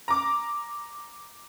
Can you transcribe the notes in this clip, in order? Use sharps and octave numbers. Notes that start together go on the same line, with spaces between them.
A#5 D6